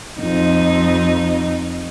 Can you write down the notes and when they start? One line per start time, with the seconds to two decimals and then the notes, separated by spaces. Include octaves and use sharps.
0.20 F2 D#4